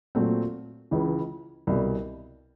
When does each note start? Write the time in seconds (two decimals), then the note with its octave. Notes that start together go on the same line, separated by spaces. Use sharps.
0.15 A#2 F#3 A3 C4
0.91 C#2 C#3 E3
1.67 C2 B2 G3